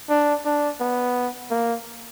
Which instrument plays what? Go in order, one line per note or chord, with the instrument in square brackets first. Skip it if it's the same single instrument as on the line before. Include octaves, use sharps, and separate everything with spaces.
[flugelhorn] D4
D4
B3
A#3